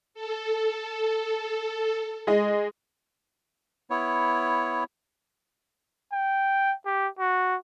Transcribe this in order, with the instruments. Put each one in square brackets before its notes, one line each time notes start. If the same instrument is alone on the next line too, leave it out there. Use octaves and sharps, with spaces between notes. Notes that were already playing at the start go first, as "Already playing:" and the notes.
[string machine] A4
[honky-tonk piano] G#3 G#4 D#5
[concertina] B3 E4 C#5
[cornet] G5
G4
F#4